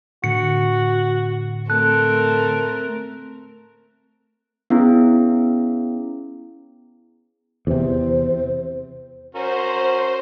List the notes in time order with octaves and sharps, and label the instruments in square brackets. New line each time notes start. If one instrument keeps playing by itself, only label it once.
[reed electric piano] A2 D3 [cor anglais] F#4 [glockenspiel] C#7
[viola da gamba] A3 C4 A#4 [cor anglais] A4 [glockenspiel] F#6
[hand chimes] B3 C#4 E4 G#4
[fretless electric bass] E2 C3 [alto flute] C5
[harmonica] C#4 F#4 A#4 [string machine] C5